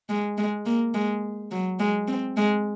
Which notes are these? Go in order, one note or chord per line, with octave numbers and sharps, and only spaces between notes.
G#3
G#3
A#3
G#3
F#3
G#3
C4
G#3